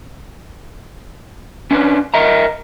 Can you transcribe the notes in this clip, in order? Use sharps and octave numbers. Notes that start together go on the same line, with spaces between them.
C#4 D4 B4
A#4 D#5 E5 A#5